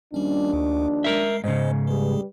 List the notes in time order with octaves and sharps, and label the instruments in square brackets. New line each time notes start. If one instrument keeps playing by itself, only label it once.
[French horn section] D#2 F3 D4 [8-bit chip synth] G3 C#4
[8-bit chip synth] D2
[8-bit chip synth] G#3 C7 [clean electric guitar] A#4 E5
[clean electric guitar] G#2 C#3 [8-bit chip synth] G#3 C5 D#5
[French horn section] G3 B4 [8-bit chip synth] G#3 G#4